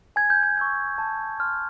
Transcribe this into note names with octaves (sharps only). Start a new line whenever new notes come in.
G#5 G#6
G6
G#6
C#6 E6 G6
A5
C6 F6